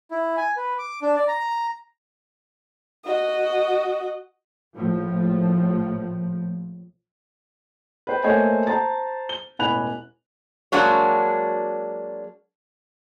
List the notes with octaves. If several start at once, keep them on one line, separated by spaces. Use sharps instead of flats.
E4
G#5
B4
D6
D4
D5
A#5
F#4 D#5
A#1 A2 F3
B4 C5 G5
A3 A#3 C5 C#5 D#5 G#5
C5 A5 A#5 A6
G7
E1 A1 G#5 B5 F#6 F7
F#3 G#3 A#3 D4 F#4 C#5